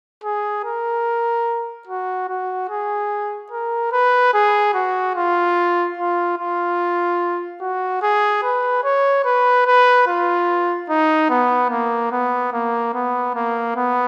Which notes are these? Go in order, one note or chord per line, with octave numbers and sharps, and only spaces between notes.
G#4
A#4
F#4
F#4
G#4
A#4
B4
G#4
F#4
F4
F4
F4
F#4
G#4
B4
C#5
B4
B4
F4
D#4
B3
A#3
B3
A#3
B3
A#3
B3